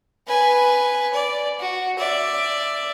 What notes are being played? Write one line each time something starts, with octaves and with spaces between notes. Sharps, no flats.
B4 G#5
D5
F#4
D5 E5